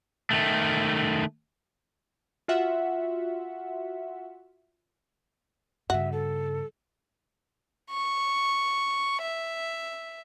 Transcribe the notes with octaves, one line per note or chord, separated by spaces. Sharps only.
D#3 A3
F4 F#4 E5 F#5
G2 C#3 F#4 E5
A4
C#6
E5